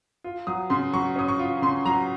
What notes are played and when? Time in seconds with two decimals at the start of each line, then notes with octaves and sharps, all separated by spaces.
0.24 F4
0.47 F#3 D#6
0.70 C#3 C6
0.93 F#3 C#6
1.16 C#4 D#6
1.28 C#6
1.39 F4
1.62 C#3 C6
1.85 F#3 A#5